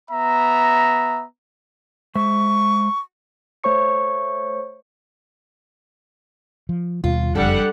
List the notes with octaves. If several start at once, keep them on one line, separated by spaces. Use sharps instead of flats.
B3 E5 A#5
G#3 C5 E5 C#6
A3 C5 C#5 C#6 C#7
F3
D#2 B2 G3 F4
F#1 F2 G3 D4 A4 F#5